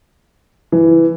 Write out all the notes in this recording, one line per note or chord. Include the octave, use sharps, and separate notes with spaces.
E3